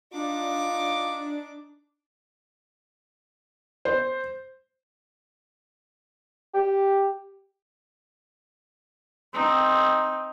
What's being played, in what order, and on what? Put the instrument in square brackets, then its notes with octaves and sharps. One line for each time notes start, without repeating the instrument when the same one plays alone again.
[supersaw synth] D4 [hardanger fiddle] D#4 D6 [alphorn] F4
[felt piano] C5
[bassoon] G4
[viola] C4 D#4